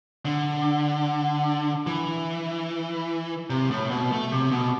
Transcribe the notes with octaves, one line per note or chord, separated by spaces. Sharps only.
D3
E3
C3
A2
B2
A3
C3
B2